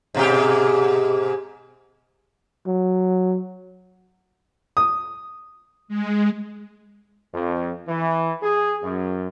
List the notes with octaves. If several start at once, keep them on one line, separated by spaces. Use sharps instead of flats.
G#2 B2 G4
F#3
D#6
G#3
F2
E3
G#4
F#2